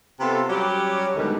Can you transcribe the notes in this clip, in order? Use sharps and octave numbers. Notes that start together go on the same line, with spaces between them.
C3 B3 F4 A4
F#3 G3 C#4 G4
D2 B2 D#3 G3 G#3 B3